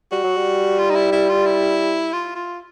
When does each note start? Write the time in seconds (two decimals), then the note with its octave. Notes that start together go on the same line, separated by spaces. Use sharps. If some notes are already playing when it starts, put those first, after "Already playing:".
0.12 G3 F#4
0.24 F#3
0.36 G3
0.79 F4
0.90 D#4
0.95 E4
1.12 E4
1.29 F4
1.46 E4
2.13 F4
2.35 F4